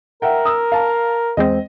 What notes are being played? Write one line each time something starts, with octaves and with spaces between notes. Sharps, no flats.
A#4 E5 F#5 G5
D#6 E6
F5 A5
E2 G#3 C4 D#5